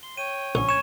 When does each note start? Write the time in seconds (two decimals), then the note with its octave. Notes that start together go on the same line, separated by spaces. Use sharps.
0.03 C6 G7
0.17 C#5 G5 D#7
0.55 A#1 C#4 C#5 C#6
0.69 C#6 G#6 E7